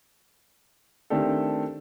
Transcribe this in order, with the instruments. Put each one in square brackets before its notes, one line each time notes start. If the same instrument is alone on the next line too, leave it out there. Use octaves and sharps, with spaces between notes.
[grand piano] D#3 A3 C4 D4 G4 A4